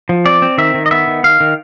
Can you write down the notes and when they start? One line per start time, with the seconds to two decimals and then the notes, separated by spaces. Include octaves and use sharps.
0.09 F3
0.25 C4 D5
0.42 C4
0.58 D#3 E5
0.74 D#3
0.86 D#5
0.91 B3 E5
1.08 D#3
1.24 D#3 F5
1.40 D#3